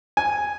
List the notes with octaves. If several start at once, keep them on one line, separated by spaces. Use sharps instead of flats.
G#5